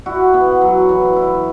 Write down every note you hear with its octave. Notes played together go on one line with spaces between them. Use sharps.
E4 F#4
B3
F#3
E3
E4